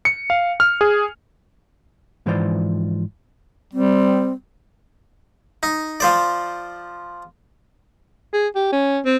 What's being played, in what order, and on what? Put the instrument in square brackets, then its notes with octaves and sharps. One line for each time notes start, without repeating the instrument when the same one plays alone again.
[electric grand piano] C#7
F5
F6
G#4
[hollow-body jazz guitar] G#2 E3 F3 C5 D5
[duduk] G3 [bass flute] C4
[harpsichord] D#4
F3 C5 D5
[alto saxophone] G#4
G4
C#4
C4